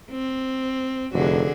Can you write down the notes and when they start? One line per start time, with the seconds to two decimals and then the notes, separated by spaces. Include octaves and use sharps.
0.11 C4
1.13 F1 D3 F#4 G#4